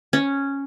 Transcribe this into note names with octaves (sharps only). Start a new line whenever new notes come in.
C#4